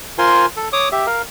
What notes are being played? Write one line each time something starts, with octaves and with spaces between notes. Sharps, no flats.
F4 A#4 C5 G#5 C6
A4
C#5 D6 D#6
G4 E5
A#4 F5